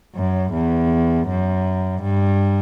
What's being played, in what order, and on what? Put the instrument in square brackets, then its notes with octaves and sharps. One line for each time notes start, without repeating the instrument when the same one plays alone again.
[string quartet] F#2
E2
F#2
G2